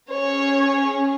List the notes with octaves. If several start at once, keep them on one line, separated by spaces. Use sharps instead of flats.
C#4 G#4 C#5